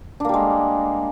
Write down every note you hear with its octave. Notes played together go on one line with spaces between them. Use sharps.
G3 G#3 A#3 D4